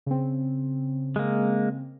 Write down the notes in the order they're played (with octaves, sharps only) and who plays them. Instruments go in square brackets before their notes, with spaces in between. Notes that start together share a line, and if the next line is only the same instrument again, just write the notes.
[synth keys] C#3 C4
[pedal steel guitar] G#3 A#3